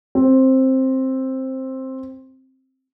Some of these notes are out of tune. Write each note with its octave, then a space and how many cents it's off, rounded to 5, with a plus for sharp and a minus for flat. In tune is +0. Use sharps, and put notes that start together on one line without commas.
C4 +10